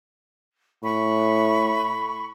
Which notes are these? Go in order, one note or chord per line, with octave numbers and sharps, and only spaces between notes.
A2 B5 C#6